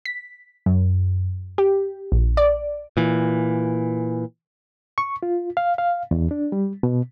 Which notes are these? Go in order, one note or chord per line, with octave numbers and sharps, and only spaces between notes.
B6
F#2
G4
A#1
D5
A#2 E3
C#6
F4
F5
F5
E2
D4
G3
B2